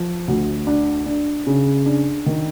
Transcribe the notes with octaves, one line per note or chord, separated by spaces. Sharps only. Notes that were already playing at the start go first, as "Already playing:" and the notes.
Already playing: F3
D2
D4
D4
C#3
D4
D#3